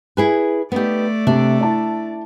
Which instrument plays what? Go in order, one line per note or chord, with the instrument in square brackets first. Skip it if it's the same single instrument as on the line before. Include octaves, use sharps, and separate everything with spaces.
[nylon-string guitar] E4 G#4 B4
[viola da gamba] A3 D5 [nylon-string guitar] B3 D#4 G4
[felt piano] C3 [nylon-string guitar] D4
[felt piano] E4 A5